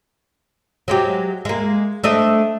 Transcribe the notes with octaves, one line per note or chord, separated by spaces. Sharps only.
F#3 G#3 G4
G#3 A#3
A3 D4 D#5